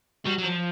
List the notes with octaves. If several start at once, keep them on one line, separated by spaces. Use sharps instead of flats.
F#3 G3
F#3
F3